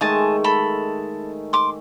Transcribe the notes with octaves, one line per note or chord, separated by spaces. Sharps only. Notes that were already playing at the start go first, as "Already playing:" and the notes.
D#3 G#3 A3 D#5 G#5 A5
A4 B5
C6 D6